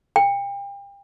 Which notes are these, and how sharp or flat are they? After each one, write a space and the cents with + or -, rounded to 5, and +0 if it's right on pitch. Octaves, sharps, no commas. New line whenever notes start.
G5 +35